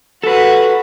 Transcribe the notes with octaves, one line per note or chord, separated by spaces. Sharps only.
F#4 A4 B4